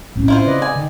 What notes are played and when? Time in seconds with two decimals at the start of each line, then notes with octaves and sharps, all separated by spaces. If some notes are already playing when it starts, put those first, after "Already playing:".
0.16 A2 C4 C#4
0.28 E4 F4 C5
0.46 C#3 B4 D5 D#5
0.62 G#5
0.76 D3 D#3